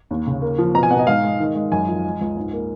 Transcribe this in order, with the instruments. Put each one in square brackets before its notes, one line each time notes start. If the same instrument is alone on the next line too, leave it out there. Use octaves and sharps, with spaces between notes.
[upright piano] D#2
C#3
A#3
F3
B2 A#5
G#5
B2 F#5
D#5
G#2 F5
G#3
D#3
G#3
F#2 G#5
F3
G#3
C#2
G#2
A#3